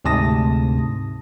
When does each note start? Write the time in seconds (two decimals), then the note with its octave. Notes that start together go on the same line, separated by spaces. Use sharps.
0.05 D2 G#2 C3 A5 D#6 A#6